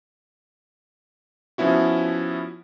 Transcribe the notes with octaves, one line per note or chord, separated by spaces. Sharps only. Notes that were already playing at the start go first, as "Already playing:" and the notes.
F3 B3 C#4 E4 F#4